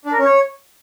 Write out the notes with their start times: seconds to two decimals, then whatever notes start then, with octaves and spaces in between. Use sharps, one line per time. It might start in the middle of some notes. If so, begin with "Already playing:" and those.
0.05 D4
0.12 A#4
0.18 C#4
0.25 C#5